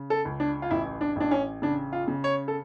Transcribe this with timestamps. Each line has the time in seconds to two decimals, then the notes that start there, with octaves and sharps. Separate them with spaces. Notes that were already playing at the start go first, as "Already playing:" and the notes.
Already playing: C#3
0.10 A4
0.25 C#2
0.40 D4
0.62 F4
0.71 A1 E4
1.01 D4
1.16 A1 D4
1.31 C#4
1.62 C#3 D4
1.93 F4
2.08 C#3
2.24 C#5
2.48 A4